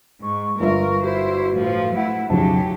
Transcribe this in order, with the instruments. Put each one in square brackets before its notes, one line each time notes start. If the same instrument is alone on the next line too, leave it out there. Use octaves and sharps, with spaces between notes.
[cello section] G#2 [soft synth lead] C#6
[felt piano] G1 F4 E5 [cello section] A#4
[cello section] E4 C5 [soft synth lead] F#4
[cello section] A2 F3
[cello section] A3 E4 [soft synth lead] F#5
[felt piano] B1 F2 C#3 [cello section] F#3 G4 [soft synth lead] A5